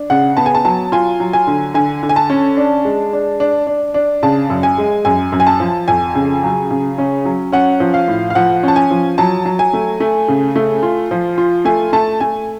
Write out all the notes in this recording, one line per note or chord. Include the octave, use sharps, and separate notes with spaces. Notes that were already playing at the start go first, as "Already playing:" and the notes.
Already playing: D4
C#3 F#5
B3 A5
G#5
A5
F#3 A5
F4 G#5
F#3
G#5
D3
D3 G#5
D3
G#5
A5
C#4
D4
G#3
D4
D4
D4
D4
C#3 A5
F#2
G#5
G#3
F#2 G#5
F#2
G#5
A5
F3
F2 G#5
C#3
F#3
C#3
C#4
F#3
C#4 F#5
F3
F5
A2
F5
F3 F#5
C#4 A5
G#5
F3
F#3 A5
F#3
G#5
A3
A3
C#3
A3
F4
F3
F4
A3 G#5
A3 A5
A3 G#5